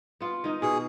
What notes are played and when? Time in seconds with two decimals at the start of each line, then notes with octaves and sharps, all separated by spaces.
0.20 B3 F4
0.44 D#3 D#4
0.62 B2 G#4 A4